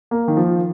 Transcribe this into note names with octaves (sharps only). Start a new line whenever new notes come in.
A#3
D#3
F3